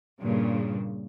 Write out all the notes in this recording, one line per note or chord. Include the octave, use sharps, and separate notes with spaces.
G2 A#2 C#3